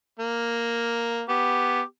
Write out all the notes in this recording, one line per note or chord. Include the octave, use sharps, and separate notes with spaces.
A#3
B3 G4